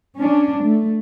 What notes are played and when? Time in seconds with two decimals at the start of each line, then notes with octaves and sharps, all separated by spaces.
0.16 C#4 D4
0.63 A3